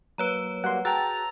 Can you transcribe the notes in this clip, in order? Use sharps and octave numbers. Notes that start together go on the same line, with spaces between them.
F#3 A#3 B4 C#5 A#5
F#3 G3 A#3 F#5 C6
F#4 G#4 G5 A5 A#5 E6 F#6 A6